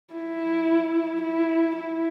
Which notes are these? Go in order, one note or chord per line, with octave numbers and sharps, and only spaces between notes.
E4
E4
E4